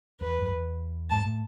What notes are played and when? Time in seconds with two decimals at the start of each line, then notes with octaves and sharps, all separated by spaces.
0.20 E2 B4
0.42 F2
0.51 E2
1.10 G#2 A5
1.25 A2